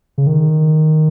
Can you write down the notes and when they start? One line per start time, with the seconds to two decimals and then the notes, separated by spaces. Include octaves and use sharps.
0.18 C#3
0.27 D#3